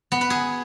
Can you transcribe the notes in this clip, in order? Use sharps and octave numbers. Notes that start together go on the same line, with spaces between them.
B3
B4
G#4